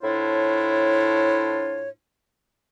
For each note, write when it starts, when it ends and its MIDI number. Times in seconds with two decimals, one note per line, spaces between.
0.02 1.89 45
0.02 1.89 62
0.02 1.89 64
0.02 1.89 65
0.02 1.89 72
0.02 1.89 73